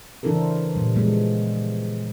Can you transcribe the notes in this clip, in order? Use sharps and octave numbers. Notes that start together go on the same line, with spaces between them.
C#3 E3 D4 E4 A4 A#4
C5
A#2 G3
F3 G#3 B3